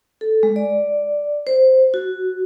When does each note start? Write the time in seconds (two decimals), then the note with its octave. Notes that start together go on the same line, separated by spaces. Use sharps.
0.21 A4
0.43 G#3
0.56 D5
1.47 C5
1.94 F#4